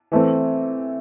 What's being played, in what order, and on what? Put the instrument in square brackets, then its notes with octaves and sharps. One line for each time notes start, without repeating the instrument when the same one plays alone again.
[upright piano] E3 A3 C4